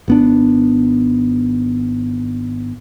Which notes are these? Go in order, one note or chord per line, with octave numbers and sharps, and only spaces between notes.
G#1 B3 D4